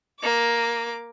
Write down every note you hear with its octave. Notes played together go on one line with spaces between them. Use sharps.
A#3 D6